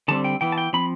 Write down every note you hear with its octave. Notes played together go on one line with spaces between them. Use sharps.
D3 G3 C4 A5
G5
E3 B3 G5
A5
G5
F3 C4 B5